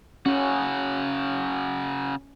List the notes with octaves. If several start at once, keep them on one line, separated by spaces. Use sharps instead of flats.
C#3 C#4 F#4